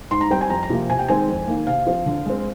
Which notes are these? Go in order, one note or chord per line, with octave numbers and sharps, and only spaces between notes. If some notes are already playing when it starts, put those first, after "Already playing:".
G#2 C6
A#5
G3 C4 G5
G#5
F2 A#5
A#5
C3 F3 A#3
C3 G#5
G5
D#3 G#3 C4 G#5
F2
D#3 A#3
C3 F5
F3 C4
D3
G#3 C4